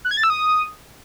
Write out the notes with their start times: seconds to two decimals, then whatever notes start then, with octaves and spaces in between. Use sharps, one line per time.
0.05 F#6
0.11 G#6
0.17 A6
0.23 E6
0.30 D#6